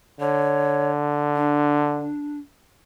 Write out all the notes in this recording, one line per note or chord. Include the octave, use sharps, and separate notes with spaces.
D3 C#5
D4